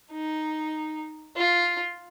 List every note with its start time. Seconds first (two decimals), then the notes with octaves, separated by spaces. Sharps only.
0.12 D#4
1.36 F4